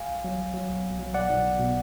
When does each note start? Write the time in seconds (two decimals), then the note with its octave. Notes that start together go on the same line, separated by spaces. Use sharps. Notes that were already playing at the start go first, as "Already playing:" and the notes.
Already playing: F5 G#5
0.09 B1
0.24 F#3
0.38 F#3
0.54 F#3
0.69 B1
0.84 B1
0.99 F#3
1.14 B1 D5 F#5
1.30 B1
1.45 B1
1.59 B2